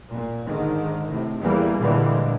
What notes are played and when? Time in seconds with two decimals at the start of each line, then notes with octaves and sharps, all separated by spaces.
0.12 A#2
0.45 G#2 D3 D#3
1.09 A2 C3
1.41 E2 E3 G3 A#3
1.80 A#2 D3 E3 G3 G#3